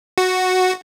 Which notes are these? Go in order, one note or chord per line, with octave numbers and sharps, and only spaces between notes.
F#4